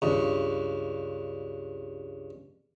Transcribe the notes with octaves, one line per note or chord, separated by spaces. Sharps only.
C#2 G2